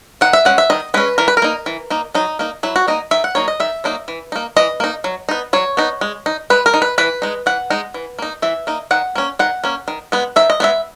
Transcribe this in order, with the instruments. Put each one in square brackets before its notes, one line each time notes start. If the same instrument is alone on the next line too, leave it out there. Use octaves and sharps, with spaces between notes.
[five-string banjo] D#3 F#5
E5
G#3 C#4 F#5
E5
D#3 D#5
G#3 C#4 B4
E3 A#4
B4
A#4
A#3 D#4
E3
A#3 D#4
F#3 D#4
A#3 D#4
F#3 E4
F#4
A#3 D#4 D#5
D#3 E5
F#5
F#3 A#3 D#4 C#5
D#5
D#3 E5
F#3 A#3 D#4
E3
A#3 D#4
E3 D#5
A#3 D#4
F#3
B3 D#4
F#3 C#5
B3 D#4
G#3
D#4
G#3 B4
A#4
D#4
B4
E3 B4
G#3 D#4
E3 F#5
G#3 D#4
E3
A#3 D#4
E3 E5
A#3 D#4
D#3 F#5
A#3 C#4
D#3 F#5
A#3 C#4
D#3
G#3 B3
D#3 E5
D#5
G#3 B3 E5